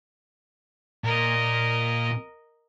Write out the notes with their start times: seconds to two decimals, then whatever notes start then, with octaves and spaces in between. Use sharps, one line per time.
1.04 A#2 A#4 D#5